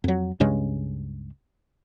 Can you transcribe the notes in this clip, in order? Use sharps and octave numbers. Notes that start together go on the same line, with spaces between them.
F2 F#3
C#2 G2 C#3 G#3